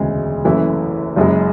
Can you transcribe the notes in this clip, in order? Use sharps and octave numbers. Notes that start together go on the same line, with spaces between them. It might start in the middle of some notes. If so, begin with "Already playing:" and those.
Already playing: E1 D2 C#3 G#3
F#1 F#2 E3 A3 E4
F#1 F#2 C#3 G#3